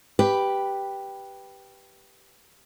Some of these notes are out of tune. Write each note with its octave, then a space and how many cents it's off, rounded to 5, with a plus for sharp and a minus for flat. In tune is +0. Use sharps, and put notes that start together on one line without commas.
G4 +0 B4 +0